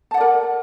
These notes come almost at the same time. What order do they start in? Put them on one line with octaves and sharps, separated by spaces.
A5 F#5 D5 A#4